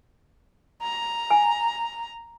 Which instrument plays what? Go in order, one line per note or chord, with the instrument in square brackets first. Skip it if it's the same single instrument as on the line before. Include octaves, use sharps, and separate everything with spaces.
[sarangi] A#5
[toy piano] G#5